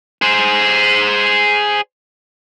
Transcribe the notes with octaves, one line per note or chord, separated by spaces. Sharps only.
G#4 C5